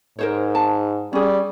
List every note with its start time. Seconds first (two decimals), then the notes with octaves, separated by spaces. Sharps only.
0.19 G#2 A#4 C5 C#5
0.55 A5
1.13 G3 C#4 G#4